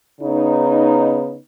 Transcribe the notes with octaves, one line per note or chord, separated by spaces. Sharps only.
C#3 B3 D#4